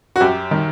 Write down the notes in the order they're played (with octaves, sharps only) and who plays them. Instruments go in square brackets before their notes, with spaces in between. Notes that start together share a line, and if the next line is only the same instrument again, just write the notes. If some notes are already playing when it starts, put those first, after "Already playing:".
[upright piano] F#4
F#2 G4
D#3